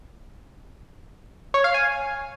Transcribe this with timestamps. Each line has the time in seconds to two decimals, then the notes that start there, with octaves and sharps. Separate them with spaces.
1.54 C#5
1.64 F5
1.74 G#5